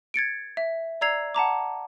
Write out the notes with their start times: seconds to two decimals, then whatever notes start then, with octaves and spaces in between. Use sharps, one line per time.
0.14 G#6 A6 C#7 D7
0.57 E5
1.01 D5 A#5 E6 G#6 C7 F7
1.35 F#5 A5 A#5 D6